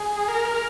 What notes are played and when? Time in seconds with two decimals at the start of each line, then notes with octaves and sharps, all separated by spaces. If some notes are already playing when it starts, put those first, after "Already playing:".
Already playing: G#4
0.28 A#4